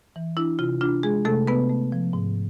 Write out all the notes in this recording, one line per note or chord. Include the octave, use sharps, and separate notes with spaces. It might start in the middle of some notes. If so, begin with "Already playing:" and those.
E3
D4 E4
C3 F4
D4 F4
G#3 G#4
C3 A3 A4
C3 B3 B4
A3
F3
G#2